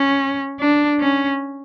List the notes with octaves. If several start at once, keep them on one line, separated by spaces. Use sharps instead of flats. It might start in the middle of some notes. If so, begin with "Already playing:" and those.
Already playing: C#4
D4
C#4